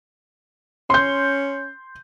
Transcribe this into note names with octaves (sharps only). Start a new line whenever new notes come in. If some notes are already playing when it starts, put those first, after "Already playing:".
C#4 C6 G6